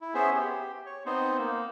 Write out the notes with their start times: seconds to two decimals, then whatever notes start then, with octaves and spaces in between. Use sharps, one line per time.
0.01 E4
0.14 B3 C#4 G#4 C5 E5
0.35 G4
0.86 C#5
1.06 B3 C4 D#4 C5
1.39 A#3